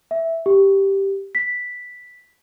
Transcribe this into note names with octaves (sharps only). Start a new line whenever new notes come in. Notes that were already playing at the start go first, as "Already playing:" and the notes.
E5
G4
B6